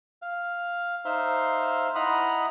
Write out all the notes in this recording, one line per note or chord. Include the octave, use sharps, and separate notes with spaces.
F5
D#4 C5 E5 F5 C6
E4 D#5 F#5 A#5 B5 D#6